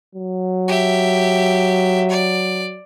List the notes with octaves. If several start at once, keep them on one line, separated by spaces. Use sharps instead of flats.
F#3
G4 E5
D5